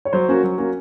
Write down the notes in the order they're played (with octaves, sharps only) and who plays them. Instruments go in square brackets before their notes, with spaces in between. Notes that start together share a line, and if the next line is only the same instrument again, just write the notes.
[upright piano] C#5
[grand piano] F#3 [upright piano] C5
[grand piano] A#3 C#4 F#4
F#3
A#3 C#4 F#4